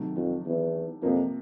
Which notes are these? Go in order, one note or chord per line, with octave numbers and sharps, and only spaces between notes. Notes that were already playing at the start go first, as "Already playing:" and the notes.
Already playing: C3 D#3 F#3 A3
F2
E2
F2 C3 F3 A#3